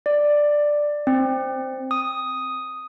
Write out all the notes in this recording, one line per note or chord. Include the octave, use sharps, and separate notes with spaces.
D5
C4
D#6